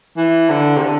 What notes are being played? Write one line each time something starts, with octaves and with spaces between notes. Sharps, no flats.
E3
D3
C3
D3